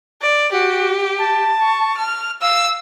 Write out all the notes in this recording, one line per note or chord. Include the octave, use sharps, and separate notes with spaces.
D5
F#4 G4
A5
C#6
F6
F5 E6